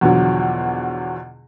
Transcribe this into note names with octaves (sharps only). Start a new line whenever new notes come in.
E2 B2 D3 F3 F#3